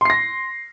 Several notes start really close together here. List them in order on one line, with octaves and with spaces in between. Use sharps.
C6 C7 A#6